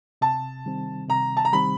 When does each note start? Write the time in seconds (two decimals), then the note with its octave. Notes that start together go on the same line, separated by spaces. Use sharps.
0.21 C3 A5
0.66 D#3 G3 C4
1.09 C3 A#5
1.37 A5
1.45 A#5
1.53 D#3 G3 C4 B5